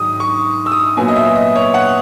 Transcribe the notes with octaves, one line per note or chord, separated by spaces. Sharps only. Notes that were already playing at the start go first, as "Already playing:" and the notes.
Already playing: G#2 D#3 F#3 D#6
C#6
E6
D#6
A#2 F#3 B3 G#5
D#5
E5
D#5
C#5
F#5